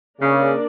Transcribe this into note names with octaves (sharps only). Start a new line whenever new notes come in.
C#3 A#3 D4 A#4 D5